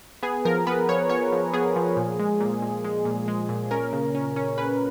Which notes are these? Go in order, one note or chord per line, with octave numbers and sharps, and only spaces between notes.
B3 G#4
F3 A#4
B3 B4
F3 C#5
B3 C#5
F3
B3 G#4
F3
A#2
G#3
A#2
A#2
G#3
A#2
G#3
A#2
C#4 A#4
C#3
C#4
C#4
C#4 B4